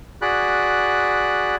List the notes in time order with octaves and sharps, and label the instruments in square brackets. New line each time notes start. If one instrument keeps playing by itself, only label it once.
[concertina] F#4 G#4 D5 B5 F#6